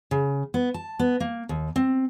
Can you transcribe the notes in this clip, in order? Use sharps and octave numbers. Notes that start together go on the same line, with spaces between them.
C#3
B3
A5
B3
A#3
D#2
C4